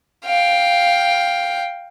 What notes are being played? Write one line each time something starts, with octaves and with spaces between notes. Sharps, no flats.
F5 G5